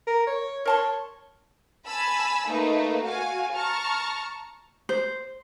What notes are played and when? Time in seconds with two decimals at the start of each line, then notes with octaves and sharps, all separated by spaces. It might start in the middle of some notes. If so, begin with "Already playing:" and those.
0.07 A#4
0.27 C#5
0.65 A#4 C#5 A5 C6
1.87 G#5 A5 B5 E6
2.48 A3 A#3 D#4 B4
3.03 F#4 F5 G#5
3.56 A5 A#5 C#6 F6
4.89 C5